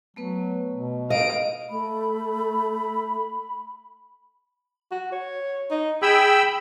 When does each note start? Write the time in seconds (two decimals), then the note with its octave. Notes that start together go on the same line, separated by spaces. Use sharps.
0.16 F#3 A3 B3 B4
0.74 B2
1.10 D#5 F5 D7
1.70 A3 B5
4.91 F#4
5.12 C#5
5.71 D#4
6.02 G#4 G5 B5 E6